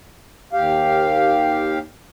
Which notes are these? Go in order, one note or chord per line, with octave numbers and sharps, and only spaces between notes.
D#2 G4 F5